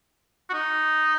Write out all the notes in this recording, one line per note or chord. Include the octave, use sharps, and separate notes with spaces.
F#4
D#4